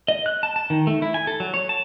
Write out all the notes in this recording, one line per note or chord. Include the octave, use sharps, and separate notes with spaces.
D#5
F#6
A5
A5
D#3
A3
E4
G#5
A4
F#3
C#5
A5